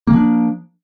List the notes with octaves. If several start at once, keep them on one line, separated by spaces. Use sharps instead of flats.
E3 F3 A#3 D4